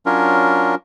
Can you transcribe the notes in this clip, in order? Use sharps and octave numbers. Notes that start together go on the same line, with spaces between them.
F#3 C#4 D4 F4 A#4